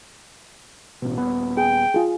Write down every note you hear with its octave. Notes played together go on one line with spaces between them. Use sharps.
A1 B2
D#1 B3
G#4 G5
F4 G#4